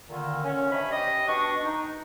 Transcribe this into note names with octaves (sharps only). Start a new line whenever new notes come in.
A#2 D3 D#3
C#4
G2 C3 D4 C#5 D#5 B5
G4 D#5
B2 D4 C#6
D#4